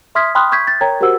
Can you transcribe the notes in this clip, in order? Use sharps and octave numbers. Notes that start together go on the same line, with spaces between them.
E5 C6 D#6 F6 G#6 B6
G5 B5 C6 D#6 F6 F#6
C#6 G6 G#6 B6
G6 A6
A#4 C#5 G5 A#5 G#6
F#4 G4 A#4 C5 F#5 E6